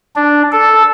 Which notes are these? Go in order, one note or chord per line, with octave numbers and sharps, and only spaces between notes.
D4
A4